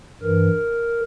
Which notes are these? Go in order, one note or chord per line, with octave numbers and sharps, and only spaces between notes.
G2 E3 A#4